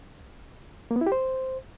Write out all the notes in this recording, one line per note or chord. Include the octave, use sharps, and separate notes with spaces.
A#3
B3
E4
G4
C5